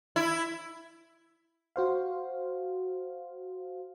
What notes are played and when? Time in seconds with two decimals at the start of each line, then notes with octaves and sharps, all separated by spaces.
0.16 E4
1.76 F#4 C5 F5